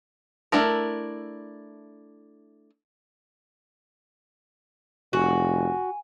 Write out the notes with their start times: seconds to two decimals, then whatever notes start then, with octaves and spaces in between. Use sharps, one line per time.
0.52 A3 D4 E4 A#4
5.13 F1 F#4 G#5